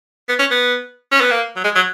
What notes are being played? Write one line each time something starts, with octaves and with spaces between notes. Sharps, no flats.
B3
C#4
B3
C#4
B3
A#3
F#3
G#3
F#3